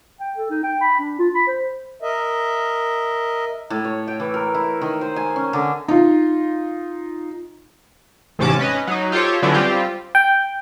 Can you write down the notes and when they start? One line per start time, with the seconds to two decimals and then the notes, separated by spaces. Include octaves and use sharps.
0.20 G5
0.36 A4
0.50 D#4
0.63 G5
0.81 B5
0.99 D4
1.19 F4
1.35 B5
1.47 C5
2.02 A#4 D#5 E5
3.70 A2
3.85 C#5
4.08 G5
4.20 E3
4.34 A#4
4.54 E4
4.81 D#3
5.01 C5
5.16 G#5
5.36 C#4
5.53 D3
5.88 D#4 F4
8.39 A1 G#2 C3 C#4 A5 D6
8.59 C#4 B4 D#5
8.87 F#3 D#4
9.12 F4 G4 A4 C5 C#5
9.42 D3 F#3 B3 C#4 D4 E4
9.54 G3 C4 F4 G4
10.15 G5